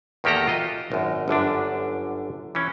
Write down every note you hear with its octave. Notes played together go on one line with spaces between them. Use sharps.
E2 D#3 A#3 G4 A4 A#5
F4 F#4 D#5
G#1 F#2
G1 F#2 D3 D4
E3 C#4